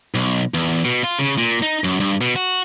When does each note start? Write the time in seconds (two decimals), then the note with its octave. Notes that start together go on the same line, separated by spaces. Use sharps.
0.14 B1
0.54 E2
0.85 B2
1.04 F4
1.19 C#3
1.38 A#2
1.63 D#4
1.84 F#2
2.00 G2
2.21 B2
2.36 F#4